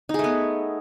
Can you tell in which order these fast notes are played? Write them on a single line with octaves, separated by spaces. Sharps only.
D#4 G#4 A3 B3